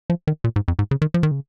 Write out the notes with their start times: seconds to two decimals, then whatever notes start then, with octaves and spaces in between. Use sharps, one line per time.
0.10 F3
0.27 D#3
0.44 A#2
0.56 G#2
0.68 F2
0.79 G#2
0.91 C#3
1.02 D#3
1.14 F3
1.23 D#3
1.31 C#3